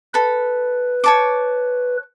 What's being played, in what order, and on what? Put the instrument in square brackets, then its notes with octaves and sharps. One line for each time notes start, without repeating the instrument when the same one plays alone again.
[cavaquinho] A4 B5 [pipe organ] B4
[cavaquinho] C#5 A5 D6